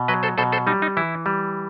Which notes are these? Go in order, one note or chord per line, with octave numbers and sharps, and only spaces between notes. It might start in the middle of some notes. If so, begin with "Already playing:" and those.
Already playing: B2
F#3 B4 D#5
A4 C5
B2 A4 C5
A4 C5
G3 D#4
D#4
E3 E4
G3